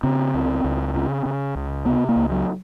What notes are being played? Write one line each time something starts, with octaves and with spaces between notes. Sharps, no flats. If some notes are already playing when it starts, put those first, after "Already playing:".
C#3 C4
C#2
C#2
C#3
C#3
C#2
C3 B3
A#3
C#2
F#3